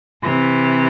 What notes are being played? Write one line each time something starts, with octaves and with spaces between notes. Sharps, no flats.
C3 E3